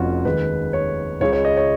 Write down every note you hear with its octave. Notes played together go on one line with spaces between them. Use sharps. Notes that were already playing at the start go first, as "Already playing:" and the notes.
Already playing: F1 F2 F3 C#4 F4 F#4
D#2 D#3 G#3 B4
C#5
C#2 C#3 G#3 C#5
C#5
D#5
C#5